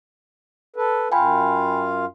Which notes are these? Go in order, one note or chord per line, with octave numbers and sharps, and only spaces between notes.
A4 B4
F#2 F4 F5 G5 G#5 B5